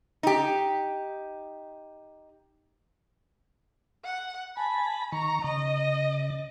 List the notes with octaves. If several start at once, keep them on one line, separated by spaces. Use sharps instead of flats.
D#4 G4
F#5
G#5 A5 B5
D#3 A#5 C#6
C#3 D#5